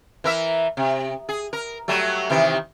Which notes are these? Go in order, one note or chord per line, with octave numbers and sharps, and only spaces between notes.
E3 A#4 E5
C3
G#4
A#4
F#3 G3 A3
C3 D#3 E3